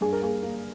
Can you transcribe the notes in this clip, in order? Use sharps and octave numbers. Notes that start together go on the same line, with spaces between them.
G2 G#4
A#4
A#3 G#4
A#3